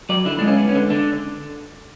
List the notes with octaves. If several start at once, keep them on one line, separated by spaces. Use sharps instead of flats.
F#3 D5
D3 E4
G#3 D4
C#4
B3
C#4
D3
D3 D4